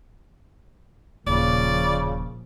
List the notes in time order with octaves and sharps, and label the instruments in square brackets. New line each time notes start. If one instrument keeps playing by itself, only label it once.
[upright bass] D#1 [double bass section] A#2 F3 [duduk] C#3 [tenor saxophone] D5